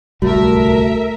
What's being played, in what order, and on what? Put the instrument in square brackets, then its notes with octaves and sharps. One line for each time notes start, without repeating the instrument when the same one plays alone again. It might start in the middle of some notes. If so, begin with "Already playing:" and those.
[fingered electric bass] D1 C2 G3 [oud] A3 [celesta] F#4 [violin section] A#4 E5